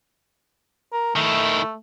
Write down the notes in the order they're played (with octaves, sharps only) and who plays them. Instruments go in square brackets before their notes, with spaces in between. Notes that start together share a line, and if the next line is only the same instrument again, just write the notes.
[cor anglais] A#4
[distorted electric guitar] D#3 E4 [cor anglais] A3